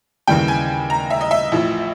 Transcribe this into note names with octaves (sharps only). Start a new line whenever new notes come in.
D#2 C#3 E3 G3 G5
G#5
A#5
E5
D#5
E5
A1 A2 F3